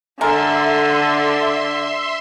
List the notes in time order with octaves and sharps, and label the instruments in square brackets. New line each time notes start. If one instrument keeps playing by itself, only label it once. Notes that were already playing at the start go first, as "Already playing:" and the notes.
[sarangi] D3 [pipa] G#3 A#4 [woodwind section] A4 [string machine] E5 C6